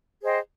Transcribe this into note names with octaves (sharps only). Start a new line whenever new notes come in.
G#4 C5 D#5 G5